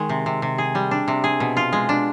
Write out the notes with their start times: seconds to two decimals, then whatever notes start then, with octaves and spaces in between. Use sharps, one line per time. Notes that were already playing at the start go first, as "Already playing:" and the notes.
Already playing: D#3 G#3
0.09 C3
0.26 C3
0.42 C3
0.58 G#4
0.75 G3
0.91 D4
1.08 C3
1.24 G#4
1.40 B2
1.57 F4
1.73 G#3
1.89 D4